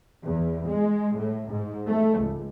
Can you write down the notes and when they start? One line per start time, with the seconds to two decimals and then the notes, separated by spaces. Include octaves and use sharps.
0.24 E2
0.68 G#3
1.18 A2
1.51 G#2
1.87 A3
2.19 C#2